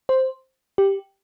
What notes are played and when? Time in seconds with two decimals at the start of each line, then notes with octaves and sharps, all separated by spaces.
0.09 C5
0.78 G4